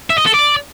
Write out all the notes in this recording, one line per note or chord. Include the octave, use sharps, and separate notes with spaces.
E5
D#5
A4
D5